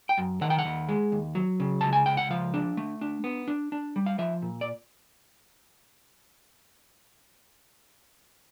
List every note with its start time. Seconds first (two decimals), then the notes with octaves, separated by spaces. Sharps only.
0.09 G5
0.18 F#2
0.41 D#3 F#5
0.50 G5
0.59 F#5
0.65 D#2
0.89 G#3
1.12 D#2
1.35 F#3
1.60 C#3
1.81 C#2 A5
1.93 G#5
2.06 C#2 G5
2.17 F#5
2.30 F3 F5
2.54 D4
2.77 A3
3.01 D4
3.24 B3
3.48 D4
3.72 D4
3.96 G3
4.06 F5
4.19 F3 E5
4.42 A#2
4.61 D5